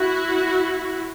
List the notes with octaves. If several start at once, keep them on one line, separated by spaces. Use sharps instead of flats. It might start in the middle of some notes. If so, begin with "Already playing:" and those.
Already playing: E4 F#4